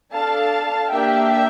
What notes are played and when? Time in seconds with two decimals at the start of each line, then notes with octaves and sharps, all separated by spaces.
0.13 D4 A4 F5 A5
0.91 A#3 D4 G4 E5 G5